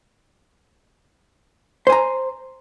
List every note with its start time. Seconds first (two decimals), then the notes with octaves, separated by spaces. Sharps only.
1.87 C5
1.90 G#5
1.92 A#5